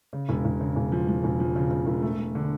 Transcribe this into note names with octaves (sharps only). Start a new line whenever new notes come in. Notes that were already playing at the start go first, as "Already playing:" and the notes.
C#3
E1
E1
C#3
E1
F3
F3
E1
F3
C#3
C#3
E1
A3
A3
D3